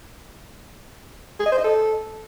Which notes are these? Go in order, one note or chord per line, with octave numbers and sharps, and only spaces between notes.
G#4
D#5
C5
D#5
A4